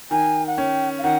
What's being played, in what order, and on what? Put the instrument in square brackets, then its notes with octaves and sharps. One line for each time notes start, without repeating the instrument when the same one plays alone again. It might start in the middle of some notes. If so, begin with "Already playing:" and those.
[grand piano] D#3 [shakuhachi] G#5
[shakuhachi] F#5
[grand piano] C#4 [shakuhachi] G5
[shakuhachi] F5
[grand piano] D#3 [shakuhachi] F#5